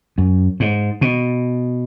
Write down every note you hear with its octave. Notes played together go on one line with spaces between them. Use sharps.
F#2
G#2
B2